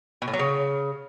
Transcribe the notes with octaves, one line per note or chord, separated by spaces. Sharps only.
B2
A2
F#3
C#3